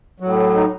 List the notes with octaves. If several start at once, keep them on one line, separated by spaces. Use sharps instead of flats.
A2 F#3
D#4